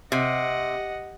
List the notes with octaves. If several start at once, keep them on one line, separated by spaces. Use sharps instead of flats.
C3 D#5 F#5